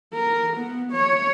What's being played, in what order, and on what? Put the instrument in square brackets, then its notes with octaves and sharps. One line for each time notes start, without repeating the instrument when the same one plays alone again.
[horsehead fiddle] A#4
B3
C#5